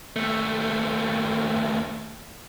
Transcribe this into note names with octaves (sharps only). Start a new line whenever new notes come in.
D#2 A3